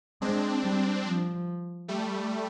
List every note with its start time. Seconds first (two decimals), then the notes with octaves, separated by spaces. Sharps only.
0.22 G#3 C4 D4
0.64 G3
1.05 F3
1.88 G3 A3